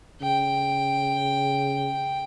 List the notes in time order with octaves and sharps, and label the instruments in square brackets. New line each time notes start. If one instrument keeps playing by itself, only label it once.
[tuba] C#3 [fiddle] G5